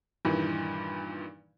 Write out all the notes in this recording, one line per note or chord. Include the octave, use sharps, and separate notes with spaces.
G2 A#2 D#3 E3